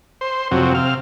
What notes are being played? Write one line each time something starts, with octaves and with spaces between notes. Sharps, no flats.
C5
F2 C3 F#3
C3 F5